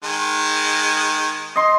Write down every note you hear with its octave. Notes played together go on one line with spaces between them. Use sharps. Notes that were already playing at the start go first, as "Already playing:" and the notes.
D#3 G#3
D#5 C6